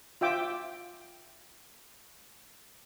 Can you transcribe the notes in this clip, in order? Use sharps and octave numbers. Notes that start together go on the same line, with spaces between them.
F4 E5 G5 D6